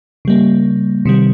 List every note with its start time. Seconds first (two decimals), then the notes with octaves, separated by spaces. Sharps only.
0.25 C#3 G3 A#3
1.05 C3 D#3 G3